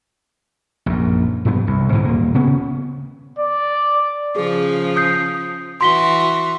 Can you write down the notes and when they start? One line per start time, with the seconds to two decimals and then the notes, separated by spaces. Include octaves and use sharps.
0.86 A#1 F#2
1.45 E1 G2 F#3 B3
1.67 C2
1.92 G#2 B2 D3 E3
2.05 D#1 A#3
2.34 C#3 B3 C#4
3.39 D5
4.36 C#3 F3 G#4
4.96 D#6 G6 C7
5.81 E3 F#4 C6 B6 G7